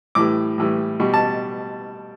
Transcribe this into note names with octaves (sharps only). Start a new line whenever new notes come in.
A2 E3 G3 D6
A2 E3 G3
B2 G3
A5